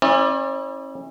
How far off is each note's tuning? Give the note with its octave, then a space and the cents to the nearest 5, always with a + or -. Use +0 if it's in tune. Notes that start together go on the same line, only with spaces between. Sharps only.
C#4 -40 E4 -35 D5 +10